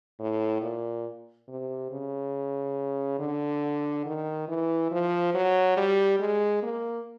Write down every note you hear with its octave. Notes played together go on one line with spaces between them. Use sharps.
A2
A#2
C3
C#3
D3
D#3
E3
F3
F#3
G3
G#3
A#3